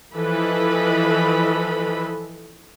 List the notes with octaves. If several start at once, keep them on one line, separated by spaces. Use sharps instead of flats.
E3 F3 A4 B4 D#5 B5